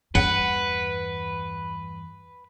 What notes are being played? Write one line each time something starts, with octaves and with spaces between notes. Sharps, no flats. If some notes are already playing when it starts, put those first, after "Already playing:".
E2 G2 B4 F#5